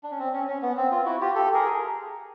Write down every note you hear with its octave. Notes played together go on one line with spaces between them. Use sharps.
D4
C#4
C4
C#4
C#4
B3
C4
F4
E4 F#4
F4 G4
G4 A4
G#4 A#4